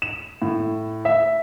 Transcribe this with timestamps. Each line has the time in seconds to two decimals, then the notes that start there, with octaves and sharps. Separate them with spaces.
0.02 E7
0.42 A2
1.05 E5